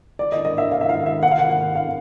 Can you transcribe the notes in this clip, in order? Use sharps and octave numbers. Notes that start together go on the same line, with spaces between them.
D5
D#5
D#5
E5
F5
E5
F5
E5
F#5
F5
F#5
F#5
F5